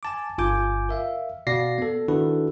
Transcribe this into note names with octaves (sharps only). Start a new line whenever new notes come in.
G#5 A5 D6
G1 F4 G#5 D6 G6
A#4 E5 F5
B2 F#4 D5 F5 A#6 C7
B3 A4
D#3 D4 E4 F#4 A4 B4